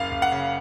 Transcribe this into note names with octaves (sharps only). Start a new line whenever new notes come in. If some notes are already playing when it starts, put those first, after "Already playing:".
Already playing: F#1 F5
F#1
F#5
C#3